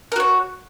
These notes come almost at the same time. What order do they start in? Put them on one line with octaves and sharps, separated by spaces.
A#4 F#4 C#5